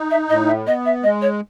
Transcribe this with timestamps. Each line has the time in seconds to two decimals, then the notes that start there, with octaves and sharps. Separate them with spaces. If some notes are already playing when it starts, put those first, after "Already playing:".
Already playing: D#4
0.11 E5
0.29 A2 D#5
0.48 E5
0.67 B3 D#5
0.85 E5
1.03 G#3 D#5
1.22 C#5